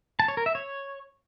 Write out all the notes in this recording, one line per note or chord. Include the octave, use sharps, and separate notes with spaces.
A5
C#5
A#4
E5
C#5